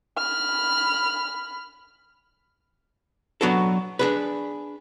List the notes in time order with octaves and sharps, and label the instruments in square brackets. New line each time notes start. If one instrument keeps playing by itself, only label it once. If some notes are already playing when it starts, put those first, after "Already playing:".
[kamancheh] B5 F6
[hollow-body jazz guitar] F#3 B3 D4 F#4 A4
D4 G#4 B4